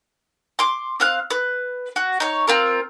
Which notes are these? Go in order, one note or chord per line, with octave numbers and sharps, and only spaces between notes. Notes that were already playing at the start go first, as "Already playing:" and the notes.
C6 D6
C4 F5 F#6
B4
F#4
D#4 C#5
C4 F4 A#4